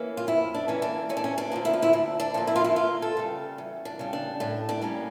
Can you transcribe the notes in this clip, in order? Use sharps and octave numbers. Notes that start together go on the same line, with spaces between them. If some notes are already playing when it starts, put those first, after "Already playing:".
Already playing: E3 A#3 C#4
F4
F2 E4
D4
E3 A#3 C#4
D4
D2 C#4
D4
C#4
D4
D3 F3 A#3
E4
F4
E4
D2 D4
D4
D3 F3 A#3
E4
F4
E4
E2 F4
A4
C#3 G3
E2
D4
C#3 G3
D4
A2 D4
D4
G3 A#3 C#4